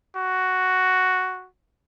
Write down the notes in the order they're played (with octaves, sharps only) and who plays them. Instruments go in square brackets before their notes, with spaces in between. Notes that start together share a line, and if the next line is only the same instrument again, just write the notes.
[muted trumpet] F#4